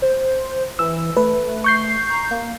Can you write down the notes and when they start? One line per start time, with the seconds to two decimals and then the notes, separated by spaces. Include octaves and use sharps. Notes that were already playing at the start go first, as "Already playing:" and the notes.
0.02 C5
0.79 E3 E6
1.17 A3 B4
1.64 C#6 G6 C7
2.10 A#5
2.31 A#3